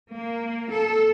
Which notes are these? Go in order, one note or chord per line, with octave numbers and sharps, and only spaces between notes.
A#3
A4